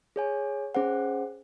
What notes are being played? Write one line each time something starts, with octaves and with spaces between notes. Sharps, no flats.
G#4 C#5 G#5
C#4 G#4 C5 F#5